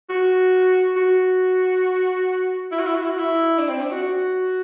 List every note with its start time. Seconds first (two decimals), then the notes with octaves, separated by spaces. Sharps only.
0.09 F#4
0.96 F#4
2.71 E4
2.79 F#4
2.87 E4
2.95 F#4
3.03 E4
3.11 F#4
3.19 E4
3.58 D4
3.69 C4
3.81 D4
3.91 F#4
4.03 F#4